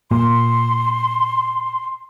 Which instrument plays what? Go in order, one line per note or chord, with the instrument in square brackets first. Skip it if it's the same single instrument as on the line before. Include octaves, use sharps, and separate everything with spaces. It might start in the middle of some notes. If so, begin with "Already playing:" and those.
[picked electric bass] A#2 [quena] C6